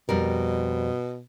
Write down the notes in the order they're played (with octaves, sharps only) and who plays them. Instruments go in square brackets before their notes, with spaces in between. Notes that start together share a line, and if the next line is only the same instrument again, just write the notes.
[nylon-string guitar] F2 G3 A#4 [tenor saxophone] B2